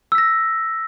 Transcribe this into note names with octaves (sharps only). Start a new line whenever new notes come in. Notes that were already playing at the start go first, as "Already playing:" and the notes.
E6 A#6 B6